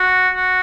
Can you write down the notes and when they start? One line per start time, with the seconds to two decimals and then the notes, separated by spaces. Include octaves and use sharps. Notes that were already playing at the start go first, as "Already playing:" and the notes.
Already playing: F#4
0.34 F#4